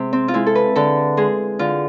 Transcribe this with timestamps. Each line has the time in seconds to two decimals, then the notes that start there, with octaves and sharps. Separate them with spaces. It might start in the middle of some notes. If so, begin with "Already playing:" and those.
Already playing: C3 G#3
0.13 C4
0.28 F4
0.34 G#3 E4
0.46 A4
0.55 B4
0.76 D3 A4
1.17 G#3 G#4
1.59 D3 F4